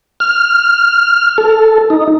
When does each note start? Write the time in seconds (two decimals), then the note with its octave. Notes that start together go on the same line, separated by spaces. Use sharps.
0.20 F6
1.38 A4
1.90 D#4